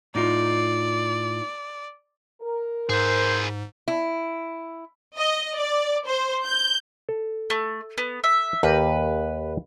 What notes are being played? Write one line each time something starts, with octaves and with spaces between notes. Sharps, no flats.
A2 D#4 F4 D5
A#4
G#2 G#4 B4 C5
E4
D#5
D5
C5
G6
A4
A3
B3
E5
D#2 G4 A#4 B4